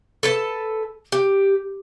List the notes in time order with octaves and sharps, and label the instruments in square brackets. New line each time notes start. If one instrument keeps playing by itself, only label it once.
[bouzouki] A4 B4 A5
G4